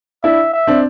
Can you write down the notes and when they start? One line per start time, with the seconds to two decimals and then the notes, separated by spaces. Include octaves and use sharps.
0.24 D4 E4 E5
0.53 E5
0.67 C4 D4